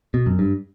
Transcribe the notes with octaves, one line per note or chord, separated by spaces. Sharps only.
B2
F#2
G2